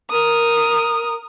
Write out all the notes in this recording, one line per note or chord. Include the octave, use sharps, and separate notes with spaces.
A#4 D#6